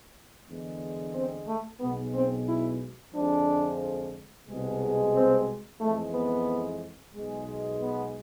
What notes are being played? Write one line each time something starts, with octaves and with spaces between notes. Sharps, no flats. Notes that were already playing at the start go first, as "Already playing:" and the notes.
E2 D3 G#3
C4
A3
B1 B2 G#3 B3
C4
E4
F2 D3 F3 G#3 D4
C2 B2 G#3
C4
F2 E3 G#3 A3
B3
B1 B2 G#3
B3